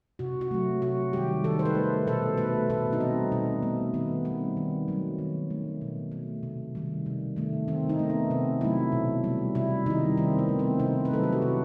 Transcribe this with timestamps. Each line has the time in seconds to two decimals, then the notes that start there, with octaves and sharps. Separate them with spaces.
0.19 C3 F#4
0.41 F#4
0.51 F#3 A3
0.82 C3 F#4
1.13 D#3 G3 G4
1.44 D#3 A4
1.59 C5
1.65 B4
1.75 A3
2.07 B2 A4
2.37 A3 B4
2.70 B2 A4
2.93 D#4
3.00 G3 C4
3.31 B2 D#4
3.62 A3 B3
3.94 D#3 B3
4.25 G3 C4
4.57 D#3
4.88 F#3 A3
5.18 D#3
5.50 A3
5.81 B2
6.12 A3
6.43 C3
6.75 D#3 G3
7.06 C3
7.36 D#3 A3
7.68 D#3 C4
7.89 D#4
7.99 A3
8.10 B3
8.30 C3 C4
8.61 F#3 A3 E4
8.92 B2
9.24 G3
9.55 C3 E4
9.86 D#3 G3 D#4
10.17 D#3 C4
10.39 B3
10.48 A3
10.59 C4
10.80 C3 D#4
11.05 B4
11.11 F#3 A3 A4
11.23 G4
11.32 F#4
11.42 C3 E4